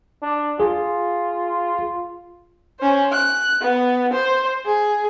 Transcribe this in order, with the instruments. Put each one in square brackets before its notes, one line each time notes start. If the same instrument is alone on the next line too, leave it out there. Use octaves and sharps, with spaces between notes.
[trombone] D4
[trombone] F4 [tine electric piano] G#4
[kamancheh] C#4 C5
F#6
B3
C5
G#4